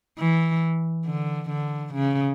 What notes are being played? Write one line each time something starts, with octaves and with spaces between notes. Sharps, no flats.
E3
D3
D3
C#3